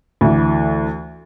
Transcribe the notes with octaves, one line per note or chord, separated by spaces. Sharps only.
D2 E3